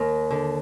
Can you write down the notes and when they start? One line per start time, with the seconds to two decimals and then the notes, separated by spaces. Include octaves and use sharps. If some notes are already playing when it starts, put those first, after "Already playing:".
Already playing: D#2 A#4
0.30 D3